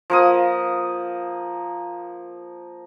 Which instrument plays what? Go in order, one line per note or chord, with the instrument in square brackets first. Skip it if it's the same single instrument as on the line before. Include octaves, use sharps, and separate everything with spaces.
[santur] F3 A#3 D#6